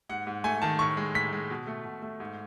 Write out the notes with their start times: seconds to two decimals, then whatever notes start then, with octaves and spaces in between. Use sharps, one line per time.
0.09 G#2 F#5
0.27 G#2
0.44 A3 G#5
0.62 D#3 A5
0.79 A2 C#6
0.97 G#3
1.14 A2 B6
1.32 G#3
1.50 B2
1.67 A3
1.85 B2
2.02 A3
2.20 G#2